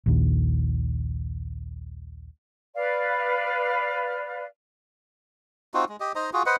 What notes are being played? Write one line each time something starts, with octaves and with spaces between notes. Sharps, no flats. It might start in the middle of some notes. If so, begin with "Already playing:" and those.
A#1 D#2
B4 D5 F5
C4 D#4 F4 F#4
G#3
G4 D#5
D#4 C5 D#5 A#5
F4 F#4 G#4
B4 C5 D#5 F#5